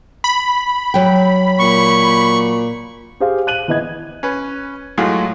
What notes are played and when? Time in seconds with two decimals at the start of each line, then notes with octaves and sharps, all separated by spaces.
0.24 B5
0.94 F#3 G5
1.59 A#2 C#6
3.20 G4 G#4 C5 F5
3.47 F#6 D#7 F#7
3.68 E3 B3 D#5 G#6
4.23 C#4 B4
4.98 A2 F#3 G#3 A3 F4